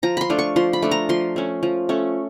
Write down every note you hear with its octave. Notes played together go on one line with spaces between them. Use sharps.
F3 A#5
B5 C6
A3 D4 F4
C#6
F3 C6
B5
A3 D4 F4
A#5
F3 C6
A3 C#4
F3
A3 C#4